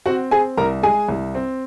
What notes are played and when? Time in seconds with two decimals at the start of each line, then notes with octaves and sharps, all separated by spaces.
0.06 C4 F#4 F#5
0.31 C4 G#4 G#5
0.57 C2 A#4 A#5
0.83 G#3 G#4 G#5
1.09 C2
1.35 C4